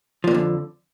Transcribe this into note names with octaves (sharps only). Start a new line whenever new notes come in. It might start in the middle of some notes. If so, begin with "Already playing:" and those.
F2 A#2 D3 F3